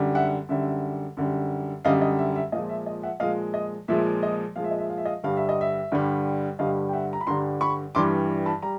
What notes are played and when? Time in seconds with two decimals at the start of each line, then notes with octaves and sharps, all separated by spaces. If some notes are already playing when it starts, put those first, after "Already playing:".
Already playing: F#2 D3 G3
0.15 E5 F#5
0.49 F#2 D3 G3 E5
1.17 F#2 D3 G3
1.85 F#2 D3 G3 D#5 F5
2.01 D#5
2.19 E5
2.36 E5
2.52 A#2 D#5 F5
2.55 F3 G#3
2.69 E5
2.86 D#5
3.03 E5 F#5
3.20 A#2 F3 G#3 D#5 F5
3.54 D#5
3.88 A#2 F3 G#3 E5
4.23 D#5
4.56 A#2 F3 G#3 F5
4.64 E5
4.71 D#5
4.79 E5
4.89 F5
4.98 E5
5.05 D#5 F5
5.23 G2 D3 G3 F5
5.37 E5
5.49 D#5
5.61 E5
5.92 G2 D3 G3
6.59 G2 D3 G3 D#5 F5
6.89 G5
6.93 E5 F#5
7.13 A#5
7.21 B5
7.27 G2 D3 G3 A#5 C6
7.61 B5 C#6
7.95 G2 E3 G3 C6 D6
8.46 A5 B5
8.62 G3 A#5